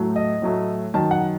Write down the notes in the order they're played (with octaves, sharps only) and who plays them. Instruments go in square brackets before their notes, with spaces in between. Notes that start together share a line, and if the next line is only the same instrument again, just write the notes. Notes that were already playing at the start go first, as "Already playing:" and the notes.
Already playing: [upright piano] A2 F#3 A3
D#5
A2 F#3 A3
F#2 D#3 F#3 A5
F#5